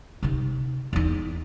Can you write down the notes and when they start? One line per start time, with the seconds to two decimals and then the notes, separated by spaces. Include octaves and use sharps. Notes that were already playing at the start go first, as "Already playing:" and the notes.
0.23 C3 D#4
0.93 E2 D#4